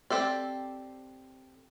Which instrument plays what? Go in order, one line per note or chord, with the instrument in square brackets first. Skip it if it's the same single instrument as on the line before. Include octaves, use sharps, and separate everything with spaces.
[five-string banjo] C4 G4 A4 D5